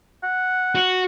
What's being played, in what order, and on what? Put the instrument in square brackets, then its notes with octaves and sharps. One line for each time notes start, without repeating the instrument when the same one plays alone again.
[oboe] F#5
[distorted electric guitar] F#4